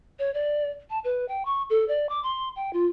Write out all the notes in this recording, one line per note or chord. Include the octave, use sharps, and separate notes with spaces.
C#5
D5
A5
B4
G5
C#6
A4
D5
D6
C6
G5
F4